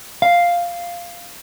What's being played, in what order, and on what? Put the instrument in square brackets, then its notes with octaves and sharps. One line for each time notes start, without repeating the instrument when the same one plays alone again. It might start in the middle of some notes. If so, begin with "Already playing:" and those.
[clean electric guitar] F5